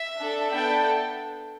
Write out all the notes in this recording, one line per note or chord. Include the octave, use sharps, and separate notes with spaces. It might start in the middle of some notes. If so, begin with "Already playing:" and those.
Already playing: E5
D4 A4
B3 D4 A4 G5